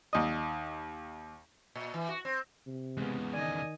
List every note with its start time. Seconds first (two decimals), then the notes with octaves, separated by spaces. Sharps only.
0.13 D#2 D#5
1.75 A#2
1.94 E3
2.09 F#4
2.25 C4
2.66 C3
2.97 E2 C#3 G#3 B3
3.33 D#3 D5 D#5 G#5